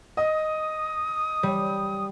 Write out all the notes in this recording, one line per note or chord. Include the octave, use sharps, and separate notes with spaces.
D#5 D#6
G3